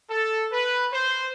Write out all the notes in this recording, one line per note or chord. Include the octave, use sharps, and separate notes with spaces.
A4
B4
C5